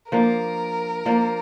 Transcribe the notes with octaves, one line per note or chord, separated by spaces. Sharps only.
F3 A#3 D4 A#4
F3 A#3 D4